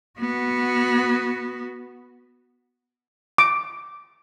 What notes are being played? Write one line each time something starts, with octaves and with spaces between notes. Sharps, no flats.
B3 F#4
D6